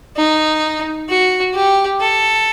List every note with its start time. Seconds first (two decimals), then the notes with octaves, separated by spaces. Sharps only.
0.16 D#4
1.09 F#4
1.54 G4
2.01 A4